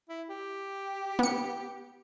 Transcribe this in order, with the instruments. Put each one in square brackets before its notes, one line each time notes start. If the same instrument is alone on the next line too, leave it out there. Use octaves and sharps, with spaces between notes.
[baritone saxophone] E4
G4
[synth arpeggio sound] B3 C#7